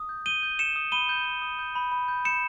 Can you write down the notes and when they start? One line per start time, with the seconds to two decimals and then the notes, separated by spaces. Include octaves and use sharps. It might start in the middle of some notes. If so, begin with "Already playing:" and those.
Already playing: D#6
0.09 G6
0.26 G6 D#7 G7
0.43 G6
0.59 D#6 C#7 E7
0.76 D#6
0.92 B5 D#7 G7
1.09 G6
1.25 G6
1.42 D#6
1.59 G6
1.75 B5
1.92 B5
2.08 G6
2.25 G6 C#7 E7